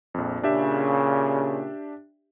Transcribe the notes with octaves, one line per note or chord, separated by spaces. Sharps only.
A#1 F2
A#2 C#3 D4 G4 E5